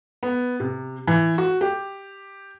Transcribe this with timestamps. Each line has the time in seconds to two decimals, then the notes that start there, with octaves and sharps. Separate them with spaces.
0.23 B3
0.60 C3
1.07 E3
1.38 F#4
1.61 G4